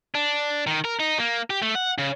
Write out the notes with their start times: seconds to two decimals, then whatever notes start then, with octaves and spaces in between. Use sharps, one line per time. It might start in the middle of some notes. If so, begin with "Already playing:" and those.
0.15 D4
0.67 D#3
0.85 A#4
1.00 D#4
1.19 A#3
1.50 G4
1.62 A3
1.75 F#5
1.98 C#3